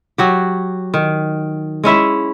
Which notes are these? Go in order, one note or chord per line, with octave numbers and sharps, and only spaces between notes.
F#3 F#4 G4
D#3
G#3 C#4 E4 E5